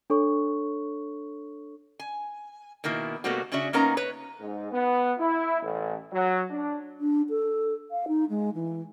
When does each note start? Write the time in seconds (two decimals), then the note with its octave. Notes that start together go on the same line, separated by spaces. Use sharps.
0.10 D4 A4 C#5 C#6
2.00 G#5
2.84 B2 D#3 A#3 E4
3.24 B2 G3 A3 A#3 C4 F#4
3.52 C#3 C#4 D4 F#4 E5
3.73 A#3 B3 C#4 D#4 A#4 A#5
3.97 B4 C#5
4.40 G#2
4.72 B3
5.18 E4
5.62 A1
6.12 F#3
6.50 D4
7.00 D4
7.29 A4
7.91 F5
8.07 D#4
8.29 G#3
8.54 E3